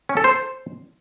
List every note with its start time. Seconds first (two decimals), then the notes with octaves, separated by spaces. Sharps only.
0.09 C#4
0.17 A4
0.24 C5